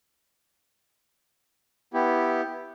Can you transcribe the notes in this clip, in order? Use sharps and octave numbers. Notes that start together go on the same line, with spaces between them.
B3 E4 G4